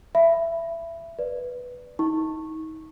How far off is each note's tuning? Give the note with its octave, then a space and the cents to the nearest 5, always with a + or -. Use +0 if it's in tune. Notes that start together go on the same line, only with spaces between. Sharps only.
E5 +20 B5 +0
B4 +0 D5 +0
D#4 +30 C#6 -15